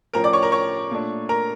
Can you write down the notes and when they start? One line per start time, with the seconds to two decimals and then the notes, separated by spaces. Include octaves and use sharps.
0.13 A2 F3 C#4 A#4 A#5
0.24 D5 D6
0.33 C#5 C#6
0.43 A#4 A#5
0.52 C#5 C#6
0.91 A#2 A3 D4
1.29 A#4 A#5